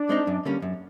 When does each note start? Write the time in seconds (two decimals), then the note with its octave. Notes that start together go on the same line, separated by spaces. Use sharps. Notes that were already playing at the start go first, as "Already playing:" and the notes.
Already playing: D4
0.09 G#3 C4 D#4
0.27 F#2
0.45 D3 G3 A#3 C#4
0.62 F#2